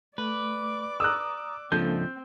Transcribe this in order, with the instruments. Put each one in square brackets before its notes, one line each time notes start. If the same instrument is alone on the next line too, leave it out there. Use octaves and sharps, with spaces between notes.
[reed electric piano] A3 [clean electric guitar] B4 [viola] D5 D6
[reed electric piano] A#5 D#6 [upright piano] E6 F#6
[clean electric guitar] C#2 F3 [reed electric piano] A#3 D4 A4 [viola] C4 [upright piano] G6